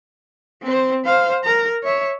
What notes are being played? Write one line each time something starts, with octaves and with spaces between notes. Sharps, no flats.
C4 C5
C5 F5
A#4 A#5
C#5 E5